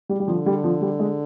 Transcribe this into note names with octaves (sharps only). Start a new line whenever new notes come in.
G3
G3
D3 F3
G3
F3
G3
G#3